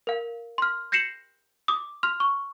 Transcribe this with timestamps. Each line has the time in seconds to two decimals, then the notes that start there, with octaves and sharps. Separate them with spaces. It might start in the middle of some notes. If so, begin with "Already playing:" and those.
0.07 A#4 F5
0.58 C6 F6
0.92 G6 A#6 C7 C#7 E7 F#7
1.68 D6 D#6
2.03 C6 F6 F7
2.20 C#6